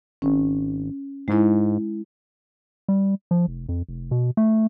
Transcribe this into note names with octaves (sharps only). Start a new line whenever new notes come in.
G#1 C#4
G#2 G#3 E4
G3
F3
F1
F2
F1
B2
A3